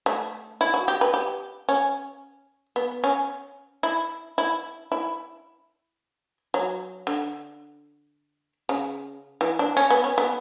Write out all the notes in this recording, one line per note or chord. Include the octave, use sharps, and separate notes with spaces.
A3
E4
F#4
G4
B4
G4
C#4
B3
C#4
E4
E4
E4
F#3
D3
C#3
E3
D4
C#4
B3
C#4
B3